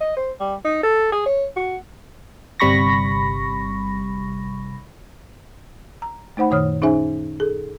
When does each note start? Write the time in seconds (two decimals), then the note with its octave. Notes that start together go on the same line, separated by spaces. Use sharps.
0.01 D#5
0.17 C5
0.40 G3
0.65 D#4
0.83 A4
1.12 G#4
1.26 C#5
1.57 F#4
2.60 G1 C3 G3 B5 C#6 A#6
6.02 A#5
6.37 A3 D#4 C5 F#5 B5
6.50 F#2 A#2 D#3 C#5 D#6 F6
6.82 C#4 D#4 G#4 C5 E5 G#5
7.40 G#4 A4